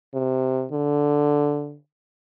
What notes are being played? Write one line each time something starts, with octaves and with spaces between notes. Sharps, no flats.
C3
D3